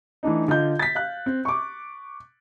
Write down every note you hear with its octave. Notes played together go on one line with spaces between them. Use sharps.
E3 A3 D4 D#4
D3 F4 D#5 G6
A6 B6
F5 F#6
C4
C#6 D6